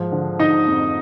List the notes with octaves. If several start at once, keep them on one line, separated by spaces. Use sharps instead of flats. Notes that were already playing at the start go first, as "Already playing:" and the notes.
Already playing: G#2 F3
D3
D3 D#4 D#5
F2